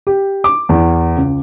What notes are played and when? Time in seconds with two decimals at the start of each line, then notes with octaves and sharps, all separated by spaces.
0.07 G4
0.44 D6
0.69 E2
1.17 C#2